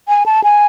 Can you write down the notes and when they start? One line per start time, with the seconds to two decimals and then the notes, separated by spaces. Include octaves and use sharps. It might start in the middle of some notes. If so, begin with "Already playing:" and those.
0.08 G#5
0.26 A5
0.44 G#5